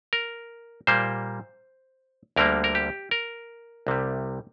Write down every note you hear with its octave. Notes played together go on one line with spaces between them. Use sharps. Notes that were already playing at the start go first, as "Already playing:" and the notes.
A#4
A#2 G3 A#3 C5
D2 D3 G3 A#3 A#4
A#4
G4
A#4
C2 C3 G3